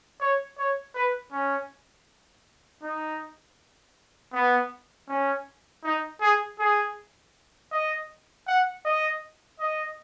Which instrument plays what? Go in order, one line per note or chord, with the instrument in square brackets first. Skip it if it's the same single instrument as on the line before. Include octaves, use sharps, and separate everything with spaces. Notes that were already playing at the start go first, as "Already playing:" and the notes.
[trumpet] C#5
C#5
B4
C#4
D#4
B3
C#4
D#4
G#4
G#4
D#5
F#5
D#5
D#5